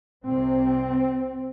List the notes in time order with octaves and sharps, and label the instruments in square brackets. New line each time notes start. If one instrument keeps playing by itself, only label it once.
[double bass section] C2 C3 C4